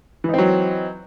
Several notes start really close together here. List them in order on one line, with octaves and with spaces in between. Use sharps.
E3 D#4 C4 F#3